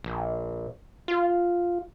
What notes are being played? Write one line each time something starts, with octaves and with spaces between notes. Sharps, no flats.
A#1
F4